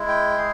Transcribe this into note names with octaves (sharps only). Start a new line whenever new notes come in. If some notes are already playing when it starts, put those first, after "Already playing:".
Already playing: G#3 E4
G5
G#4